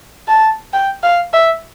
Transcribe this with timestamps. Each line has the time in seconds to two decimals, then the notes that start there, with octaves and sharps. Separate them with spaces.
0.28 A5
0.73 G5
1.03 F5
1.33 E5